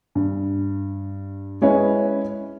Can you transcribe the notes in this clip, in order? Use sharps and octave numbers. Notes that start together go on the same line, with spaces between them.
G2
G#3 C#4 E4 B4 C#5 D#5